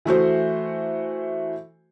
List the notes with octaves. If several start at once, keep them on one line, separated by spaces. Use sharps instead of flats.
E3 A3 F#4 C5